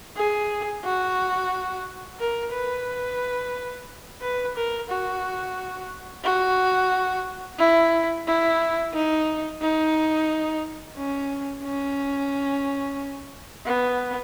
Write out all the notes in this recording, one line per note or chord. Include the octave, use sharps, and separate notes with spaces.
G#4
F#4
A#4
B4
B4
A#4
F#4
F#4
E4
E4
D#4
D#4
C#4
C#4
B3